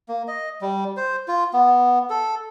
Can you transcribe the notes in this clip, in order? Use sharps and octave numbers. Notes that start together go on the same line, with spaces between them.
A#3
D#5
G3
C5
F4
B3
A4